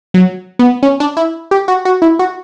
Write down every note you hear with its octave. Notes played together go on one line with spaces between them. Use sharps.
F#3
B3
C#4
D4
E4
G4
F#4
F#4
E4
F#4